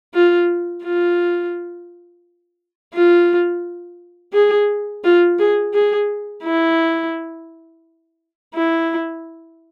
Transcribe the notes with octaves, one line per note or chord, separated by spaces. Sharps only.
F4
F4
F4
G#4
F4
G#4
G#4
E4
E4